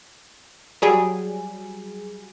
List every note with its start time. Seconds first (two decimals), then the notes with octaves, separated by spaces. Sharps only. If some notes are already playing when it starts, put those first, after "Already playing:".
0.82 F#3 G3 G#4